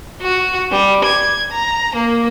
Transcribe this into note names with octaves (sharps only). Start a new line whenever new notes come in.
F#4
G3
G#6
A#5
A#3